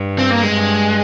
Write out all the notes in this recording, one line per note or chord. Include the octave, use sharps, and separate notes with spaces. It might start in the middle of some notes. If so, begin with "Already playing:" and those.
Already playing: G2
C4
A#3
G#3
G2